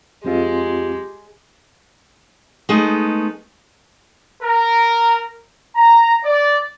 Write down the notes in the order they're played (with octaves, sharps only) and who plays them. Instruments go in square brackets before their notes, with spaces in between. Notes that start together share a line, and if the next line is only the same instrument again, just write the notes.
[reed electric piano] F2 C4 F4 [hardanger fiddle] G#3 [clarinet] G4
[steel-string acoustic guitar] G#3 A3 B3 D#4
[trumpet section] A#4
A#5
D5